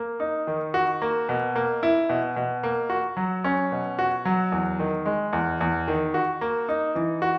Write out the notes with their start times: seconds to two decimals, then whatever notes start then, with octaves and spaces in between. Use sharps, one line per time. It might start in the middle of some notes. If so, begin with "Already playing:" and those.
Already playing: A#3
0.20 D#4
0.47 D#3
0.74 F#4
1.02 A#3
1.29 B2
1.56 A#3
1.83 E4
2.09 B2
2.36 B2
2.63 A#3
2.90 F#4
3.17 F#3
3.44 C#4
3.72 B2
3.99 F#4
4.25 F#3
4.52 E2
4.79 D#3
5.06 G#3
5.33 E2
5.60 E2
5.88 D#3
6.14 F#4
6.41 A#3
6.69 D#4
6.95 E3
7.22 F#4